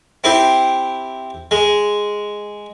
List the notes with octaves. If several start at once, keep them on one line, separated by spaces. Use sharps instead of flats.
C4 E4 G4 C5
G#3